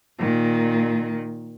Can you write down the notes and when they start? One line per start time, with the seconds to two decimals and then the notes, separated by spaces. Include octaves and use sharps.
0.19 A#2 D#3